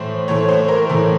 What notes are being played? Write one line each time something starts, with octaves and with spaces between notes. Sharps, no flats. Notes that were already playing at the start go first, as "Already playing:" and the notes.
Already playing: A2 E3 A3 C5
A2 E3 A3 C#5
C5
A#4
A2 E3 A3